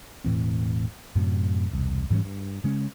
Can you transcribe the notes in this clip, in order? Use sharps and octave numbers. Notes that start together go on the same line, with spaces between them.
E1 A2 E3 C4
F#2 A2 C3 F#3
E1 C2
G#2 E3 G3 C#4
G2
C#3 G#3 C#4